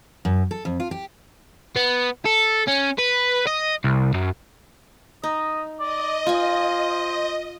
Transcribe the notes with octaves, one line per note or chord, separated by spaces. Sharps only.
F#2
A4
F2
F4
G4
B3
A4
C#4
B4
D#5
C2
F#2
D#4 D#5
D5 D#5
F4 C5 G#5